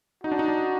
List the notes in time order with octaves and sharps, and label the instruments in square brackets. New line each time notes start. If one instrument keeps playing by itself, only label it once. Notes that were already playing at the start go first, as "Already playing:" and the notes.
[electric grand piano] D#4 [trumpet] F#4
[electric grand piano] D4
D#4
D4